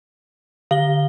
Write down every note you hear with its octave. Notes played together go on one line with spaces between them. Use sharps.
D3 F5 G7